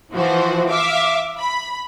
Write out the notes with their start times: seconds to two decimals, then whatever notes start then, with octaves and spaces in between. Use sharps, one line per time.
0.13 E3 F3 F#4 C5
0.70 E5 F5 D6
1.38 B5